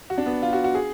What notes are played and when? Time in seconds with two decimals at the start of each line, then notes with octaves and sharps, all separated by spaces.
0.10 F#4
0.18 D4
0.26 B3
0.42 F4
0.53 F#4
0.64 F#4
0.75 G#4